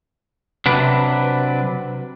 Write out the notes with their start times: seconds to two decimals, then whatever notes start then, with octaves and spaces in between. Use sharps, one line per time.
0.66 C3 F#3 D4 B4